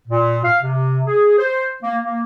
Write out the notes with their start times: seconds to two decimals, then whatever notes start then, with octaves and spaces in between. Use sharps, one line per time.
0.08 A#2
0.44 F5
0.62 C3
1.07 G#4
1.38 C5
1.83 A#3
2.03 A#3